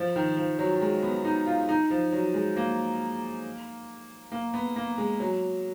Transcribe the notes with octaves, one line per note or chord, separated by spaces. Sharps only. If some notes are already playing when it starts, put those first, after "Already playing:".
Already playing: F3
D#3
F3
F#3
G#3
B3
D#4
F4
D#4
F3
F#3
G#3
A#3
A#3
B3
A#3
G#3
F#3